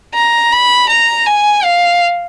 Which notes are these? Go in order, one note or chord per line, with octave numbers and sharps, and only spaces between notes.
A#5
B5
A#5
G#5
F5